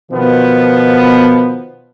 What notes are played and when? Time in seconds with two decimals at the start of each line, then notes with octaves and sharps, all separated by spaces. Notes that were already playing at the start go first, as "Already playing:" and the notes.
0.11 B2 D#3 F3 B3